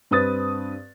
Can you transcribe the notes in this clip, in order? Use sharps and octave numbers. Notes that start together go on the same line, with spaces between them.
G2 C4 B4 D#6 A6